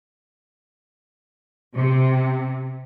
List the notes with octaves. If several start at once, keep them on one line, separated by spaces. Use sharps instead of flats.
C3